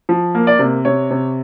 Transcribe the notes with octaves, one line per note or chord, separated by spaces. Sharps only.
F3
A#3
D5
C3
C3 C#5
C3